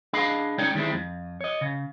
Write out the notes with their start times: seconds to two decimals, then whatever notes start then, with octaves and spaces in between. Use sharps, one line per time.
0.13 D4 G#4 D#5 F5 B5
0.58 C#3 G#3 D#4 C#5 D5 G5
0.75 D#3 G3 G#3 C4 E4
0.93 F2
1.41 C#5 D#5
1.61 C#3